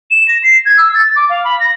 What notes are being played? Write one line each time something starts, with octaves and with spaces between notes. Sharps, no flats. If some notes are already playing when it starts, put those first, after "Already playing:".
E7
A#6
C7
G#6
E6
A6
D6
F5
B5
A#6